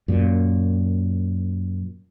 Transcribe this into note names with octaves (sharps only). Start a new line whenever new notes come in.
F#2 A#2